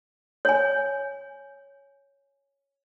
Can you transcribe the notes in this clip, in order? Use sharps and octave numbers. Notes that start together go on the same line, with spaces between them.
C#5 G#5